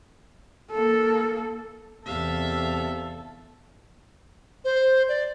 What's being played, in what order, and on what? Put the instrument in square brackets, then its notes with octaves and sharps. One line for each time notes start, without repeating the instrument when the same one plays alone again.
[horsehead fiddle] A#3 A4
[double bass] E2 [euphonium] C3 [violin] A4 [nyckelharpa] E5 F5
[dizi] C5
D5